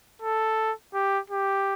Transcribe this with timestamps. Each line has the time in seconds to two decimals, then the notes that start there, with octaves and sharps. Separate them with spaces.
0.22 A4
0.94 G4
1.30 G4